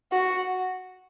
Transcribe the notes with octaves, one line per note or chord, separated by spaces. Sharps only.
F#4